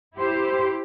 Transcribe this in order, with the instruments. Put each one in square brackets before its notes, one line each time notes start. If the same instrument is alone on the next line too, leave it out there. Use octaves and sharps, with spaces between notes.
[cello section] E4 G4 C5